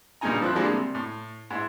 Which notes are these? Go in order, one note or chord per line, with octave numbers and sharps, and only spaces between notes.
G2 A#2 C#3 D#4 G#5 A#5
F3 C4 E4 F#6
D3 F3 G3 G#3 A#3 D4
C3
A2
G#2 E4